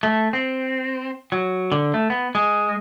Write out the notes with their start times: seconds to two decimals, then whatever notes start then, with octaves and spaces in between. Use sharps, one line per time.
0.03 A3
0.33 C4
1.32 F#3
1.72 D3
1.94 A3
2.10 B3
2.35 G#3